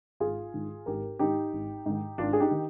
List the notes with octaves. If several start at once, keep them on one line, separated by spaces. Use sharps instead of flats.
G#1 F4 G#4
G#2 D#3
G#1 G4 A#4
G#2 D#3 D#4 G4
G#1
G#2 D#3
G#1 D4 F4
G#4
D#4 G4
D#3